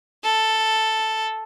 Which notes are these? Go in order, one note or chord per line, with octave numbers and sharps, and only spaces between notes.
A4